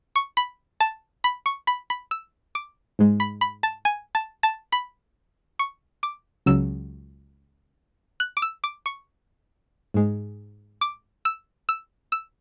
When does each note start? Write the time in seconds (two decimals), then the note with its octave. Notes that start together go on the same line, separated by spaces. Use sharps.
0.16 C#6
0.37 B5
0.80 A5
1.24 B5
1.46 C#6
1.67 B5
1.90 B5
2.11 E6
2.55 D6
2.99 G#2 G#3
3.20 B5
3.41 B5
3.63 A5
3.85 G#5
4.15 A5
4.43 A5
4.72 B5
5.59 C#6
6.03 D6
6.46 C#2 C#3 F#3 E6
8.20 F#6
8.37 D6
8.42 E6
8.64 D6
8.86 C#6
9.94 G#2 G#3
10.81 D6
11.25 E6
11.69 E6
12.12 E6